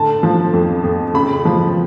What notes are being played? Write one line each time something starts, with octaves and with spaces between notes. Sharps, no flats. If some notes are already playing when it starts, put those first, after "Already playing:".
Already playing: A2 D3 A5
F3
F2
F2
C#3 B5
F3